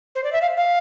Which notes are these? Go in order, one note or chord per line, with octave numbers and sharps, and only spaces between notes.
C5
D5
E5
F5
F5